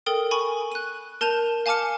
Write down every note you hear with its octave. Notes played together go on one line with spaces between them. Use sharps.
A4 A#4 G5 D#6
G#5 B5 C#6
F#6 D#7
A#4 A5 G6 D#7 F7
F5 G#5 A5 D6 F6 C#7